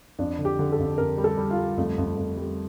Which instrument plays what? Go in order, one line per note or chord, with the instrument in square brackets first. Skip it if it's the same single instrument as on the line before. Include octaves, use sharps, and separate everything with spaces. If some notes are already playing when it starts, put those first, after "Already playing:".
[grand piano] F2 [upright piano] D4
[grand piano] D3
[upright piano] G4
[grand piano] D3
[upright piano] A4
[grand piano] F2
[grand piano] F2 [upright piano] A#4
[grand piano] G3
[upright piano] A4
[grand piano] G3
[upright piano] F4
[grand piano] G3
[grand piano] F2 [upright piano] A3
[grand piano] F2
F2
G3